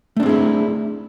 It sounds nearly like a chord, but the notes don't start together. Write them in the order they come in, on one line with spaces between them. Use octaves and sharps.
A3 D4 C4 G#4 E4